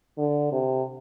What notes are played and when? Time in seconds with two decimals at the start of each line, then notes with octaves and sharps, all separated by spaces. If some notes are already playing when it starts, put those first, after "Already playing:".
0.18 D3
0.52 C3